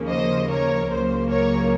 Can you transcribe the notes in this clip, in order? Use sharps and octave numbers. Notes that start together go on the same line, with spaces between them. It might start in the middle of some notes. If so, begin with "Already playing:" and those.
Already playing: D#2 C#3 F3 A#3
C5 D#5
A#4 C#5
C#2 C#3 F#3 A#3 C5
A#4 C#5